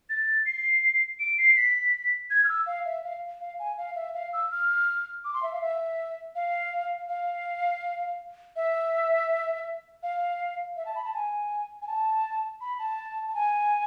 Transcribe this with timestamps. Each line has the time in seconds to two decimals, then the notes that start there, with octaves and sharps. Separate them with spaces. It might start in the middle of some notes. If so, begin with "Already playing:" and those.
0.10 A6
0.46 C7
1.20 D7
1.38 C7
1.57 B6
2.30 G#6
2.44 F6
2.49 E6
2.66 F5
2.85 E5
3.04 F5
3.41 F5
3.59 G#5
3.78 F5
3.96 E5
4.14 F5
4.33 E6
4.51 F6
5.25 D6
5.34 C6
5.43 E5
5.52 F5
5.61 E5
6.35 F5
7.09 F5
8.56 E5
10.03 F5
10.77 E5
10.86 A5
10.95 B5
11.04 A5
11.14 G#5
11.82 G#5
11.87 A5
12.61 B5
12.79 A5
13.28 A5
13.35 G#5